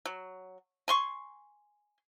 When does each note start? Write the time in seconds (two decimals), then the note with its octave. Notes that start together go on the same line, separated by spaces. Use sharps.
0.05 F#3
0.88 G#5 C6 C#6